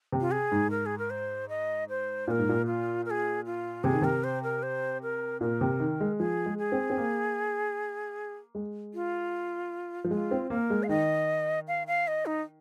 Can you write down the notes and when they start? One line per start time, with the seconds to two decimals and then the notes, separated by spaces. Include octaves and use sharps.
0.12 C3
0.21 F4
0.32 G#4
0.52 G#2
0.71 A#4
0.86 G#4
0.98 A#4
1.10 C5
1.49 D#5
1.89 C5
2.27 A#2 A#4 C5
2.38 G#2
2.49 A#2
2.66 F4
3.06 A#4
3.10 G#4
3.46 F4
3.84 C3 G#4
3.93 D#3
4.02 C3 A#4
4.24 C5
4.43 A#4
4.63 C5
5.03 A#4
5.41 A#2 A#4
5.61 C3
5.80 D#3
6.00 G#3
6.19 F3 G#4
6.46 G#3
6.59 G#4
6.72 C4
6.90 C4
6.97 A#3
8.55 G#3
8.94 F4
10.04 F3
10.11 G#3 F4
10.31 C4
10.50 A#3 A#4
10.70 G#3
10.83 F5
10.89 D#3 D#5
11.68 F5
11.87 F5
12.08 D#5
12.26 D#4